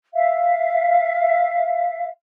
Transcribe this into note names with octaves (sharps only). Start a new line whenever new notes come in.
E5 F5